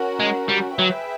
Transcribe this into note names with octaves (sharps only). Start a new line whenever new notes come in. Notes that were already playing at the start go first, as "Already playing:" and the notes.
Already playing: C#4 F#4 A#4
G#3
G3
F#3 G#4 B4 E5 G5